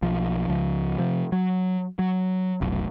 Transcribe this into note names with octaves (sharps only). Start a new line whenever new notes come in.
B1 F3
C#2 F3
C3 F3
F#3
F#3
F1 B1